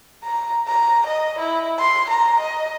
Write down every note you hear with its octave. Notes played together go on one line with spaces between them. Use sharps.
A#5
A#5
D#5
E4
C6
A#5
D#5